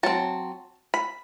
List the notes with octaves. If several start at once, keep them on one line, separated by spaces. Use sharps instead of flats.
F#3 C4 A5
B5